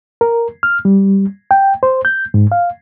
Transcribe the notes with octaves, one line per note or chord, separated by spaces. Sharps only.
A#4
F6
G3
G5
C5
G6
G#2
F5